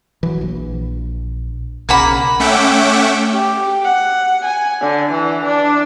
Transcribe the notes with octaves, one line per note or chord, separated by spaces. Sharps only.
E3 F#3
A#1
B1 C#3 A#3 F#5 B5
A3 C#4 E5 F#5 G5 D6
G4
F#5
G#5
D3
E3
D4